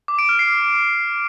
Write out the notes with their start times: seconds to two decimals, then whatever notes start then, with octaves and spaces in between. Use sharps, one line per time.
0.08 D6
0.19 D7
0.29 F6
0.39 C7